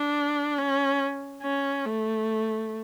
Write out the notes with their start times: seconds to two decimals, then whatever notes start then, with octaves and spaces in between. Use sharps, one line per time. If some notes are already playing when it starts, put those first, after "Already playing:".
Already playing: D4
0.58 C#4
1.43 C#4
1.86 A3